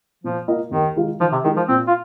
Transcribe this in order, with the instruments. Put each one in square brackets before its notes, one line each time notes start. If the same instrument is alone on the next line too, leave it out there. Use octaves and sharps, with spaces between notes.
[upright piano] A#2 [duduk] F3
[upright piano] A#3 F4 A#4 D#5
[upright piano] D#2 [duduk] D#3
[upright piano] D#3 G#3 F4
[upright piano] D#3 [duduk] F3
[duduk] C3
[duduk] D#3 [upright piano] G#3 D#4 A#4
[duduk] F3
[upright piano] A#2 [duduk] C4
[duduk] F4